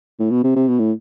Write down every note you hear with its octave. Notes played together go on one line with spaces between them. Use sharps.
A2
B2
C3
C3
B2
A2